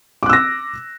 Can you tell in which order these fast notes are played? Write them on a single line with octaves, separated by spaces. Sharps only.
D6 F#6 E6 A#6